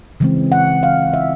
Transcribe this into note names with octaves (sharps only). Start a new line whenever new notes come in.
C#3 E3 G#3 C4
F#5
F5
E5